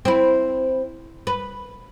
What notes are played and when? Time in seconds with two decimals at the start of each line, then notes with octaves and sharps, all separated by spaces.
0.05 C4 E4
1.27 B4